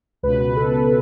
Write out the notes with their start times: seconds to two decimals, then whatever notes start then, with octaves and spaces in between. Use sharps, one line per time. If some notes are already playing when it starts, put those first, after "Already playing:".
0.23 C#2 B2 B4
0.40 B4
0.56 A4